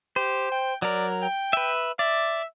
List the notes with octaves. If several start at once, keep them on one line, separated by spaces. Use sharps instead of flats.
G4 C5
G5
F#3 A#4 D5
G5
B4 E5
D5 E5